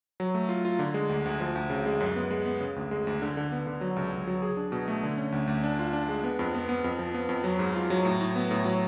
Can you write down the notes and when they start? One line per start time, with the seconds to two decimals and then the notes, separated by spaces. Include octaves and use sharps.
0.20 F#3
0.35 A3
0.49 F4
0.65 F4
0.79 D3
0.94 G#3
1.09 D2
1.26 D2
1.40 F3
1.56 D2
1.70 C#3
1.86 G#3
2.00 F#2
2.16 B3
2.31 G#3
2.46 B3
2.61 C#3
2.76 D2
2.91 G#3
3.07 D2
3.22 D3
3.37 D3
3.52 B3
3.67 D3
3.81 F#3
3.96 C#2
4.12 C#2
4.27 F#3
4.42 G#4
4.57 D4
4.72 B2
4.88 A3
5.03 D3
5.18 C#4
5.32 D2
5.47 D2
5.64 D4
5.79 F4
5.93 D4
6.09 G#3
6.24 B3
6.39 F2
6.54 B3
6.69 B3
6.84 F2
6.99 F3
7.14 B3
7.29 F2
7.44 F#3
7.59 G#2
7.75 F4
7.90 F#3
8.05 A2
8.21 A2
8.36 B3
8.51 A2
8.65 F#3